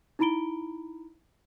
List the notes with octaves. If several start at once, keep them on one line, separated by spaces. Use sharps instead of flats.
D#4 E4 A#5 B5 D7 G7